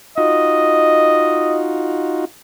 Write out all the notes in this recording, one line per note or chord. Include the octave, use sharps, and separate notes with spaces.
D#4 F4 F#4 D#5